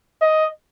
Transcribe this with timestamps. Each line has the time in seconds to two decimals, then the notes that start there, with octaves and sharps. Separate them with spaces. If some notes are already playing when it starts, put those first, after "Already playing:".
0.21 D#5